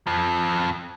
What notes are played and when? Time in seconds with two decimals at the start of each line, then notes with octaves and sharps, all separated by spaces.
0.07 F2 F3